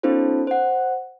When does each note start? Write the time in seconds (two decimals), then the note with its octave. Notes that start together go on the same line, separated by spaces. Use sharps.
0.03 B3 C#4 D#4 F4 A4 C5
0.47 C5 F#5